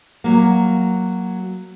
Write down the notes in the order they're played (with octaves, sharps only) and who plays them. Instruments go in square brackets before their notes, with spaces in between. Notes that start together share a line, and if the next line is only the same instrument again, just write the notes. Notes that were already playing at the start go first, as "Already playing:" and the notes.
[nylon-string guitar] F#3 A#3